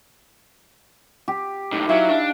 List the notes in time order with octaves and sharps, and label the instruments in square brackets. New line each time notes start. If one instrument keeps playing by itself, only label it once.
[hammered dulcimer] G4
[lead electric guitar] B1 A2 [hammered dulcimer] D#4
[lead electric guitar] F#3 [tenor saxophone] E4 [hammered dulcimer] F5
[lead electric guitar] D4